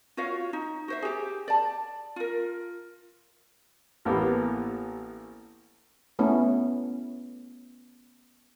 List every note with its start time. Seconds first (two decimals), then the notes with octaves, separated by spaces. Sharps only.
0.17 F4 F#4 C#5 F5
0.53 D#4
0.88 F#4 C5 E5
1.02 G4 G#4
1.48 D5 A5
2.16 F4 A#4
4.05 A1 A#3 B3 G4
6.19 A3 B3 C#4 E4